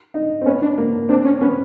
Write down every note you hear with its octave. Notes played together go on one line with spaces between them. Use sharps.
D#4
C4
B3 C#4
D4
A#3
C4 D4
C#4
B3 C#4